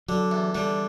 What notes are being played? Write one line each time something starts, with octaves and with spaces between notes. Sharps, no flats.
D3 F#3
E2
D3 G3